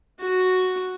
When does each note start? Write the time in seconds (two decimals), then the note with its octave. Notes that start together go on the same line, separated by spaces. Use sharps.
0.20 F#4